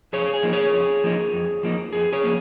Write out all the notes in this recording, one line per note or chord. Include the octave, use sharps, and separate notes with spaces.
F2 G#4 C#5
G#4
F3 A#3 D#4
G#4 C#5
F2
F3 A#3 D#4
F2
F3 A#3 D#4
F2 G#4
G#4 C#5
F3 A#3 D#4